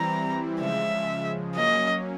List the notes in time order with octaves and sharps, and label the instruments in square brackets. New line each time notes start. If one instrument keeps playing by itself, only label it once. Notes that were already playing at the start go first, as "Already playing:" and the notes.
Already playing: [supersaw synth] E3 G3 C4 E4 [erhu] A#5
[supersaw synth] C#3 F3 G#3 [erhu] E5
[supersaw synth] F#3 A#3 C#4 [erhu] D#5